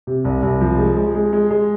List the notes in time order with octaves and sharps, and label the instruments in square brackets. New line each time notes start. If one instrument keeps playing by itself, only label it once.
[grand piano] C3
C2
C2
F3
G#3
G#3
G#3
G#3
G#3